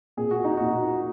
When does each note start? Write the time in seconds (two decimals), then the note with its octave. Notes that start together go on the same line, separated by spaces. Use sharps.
0.17 A#2 G#4
0.31 F#4
0.44 D#4
0.57 A#2 F#4